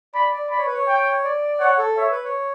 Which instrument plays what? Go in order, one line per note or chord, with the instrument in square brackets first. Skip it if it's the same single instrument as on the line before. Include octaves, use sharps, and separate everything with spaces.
[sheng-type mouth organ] D5 [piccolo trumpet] B5
[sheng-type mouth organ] D5
[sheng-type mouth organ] D5 [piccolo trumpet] B5
[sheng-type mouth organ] C#5
B4
C#5
[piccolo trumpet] G5
[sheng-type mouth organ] D5
[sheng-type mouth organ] C#5 [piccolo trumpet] F#5
[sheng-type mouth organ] A4
[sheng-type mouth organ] C#5 [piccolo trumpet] E5
[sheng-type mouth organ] B4
C#5